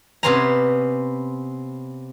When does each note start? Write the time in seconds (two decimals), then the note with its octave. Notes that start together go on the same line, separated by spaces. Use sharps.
0.23 C3 B3 C#4 C5 G#5 A#5